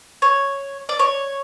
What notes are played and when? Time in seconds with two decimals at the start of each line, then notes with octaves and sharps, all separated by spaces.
0.22 C#5
0.89 D5
0.99 C#5